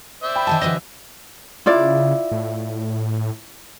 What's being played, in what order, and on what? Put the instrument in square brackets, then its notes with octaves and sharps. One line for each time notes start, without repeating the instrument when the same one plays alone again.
[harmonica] C5 D5 E5
[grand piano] G5 B5
[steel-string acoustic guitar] D#3 E3 G#4 [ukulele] A5
[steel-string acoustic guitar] D3 E3 F#3 [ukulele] B4 D#5
[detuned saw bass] C#3 [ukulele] E4 F4 D5
[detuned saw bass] A2